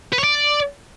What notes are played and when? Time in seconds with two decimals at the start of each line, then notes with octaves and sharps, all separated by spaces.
0.13 B4
0.18 C#5
0.24 D5